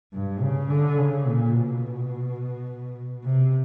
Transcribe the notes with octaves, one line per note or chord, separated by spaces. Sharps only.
G2
C#3
D3
C#3
A#2
B2
C3